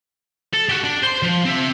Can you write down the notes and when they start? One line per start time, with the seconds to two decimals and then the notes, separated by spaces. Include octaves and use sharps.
0.54 A4
0.69 F#4 G4
0.84 D4
1.03 C5 C6
1.23 F3
1.45 C4 E5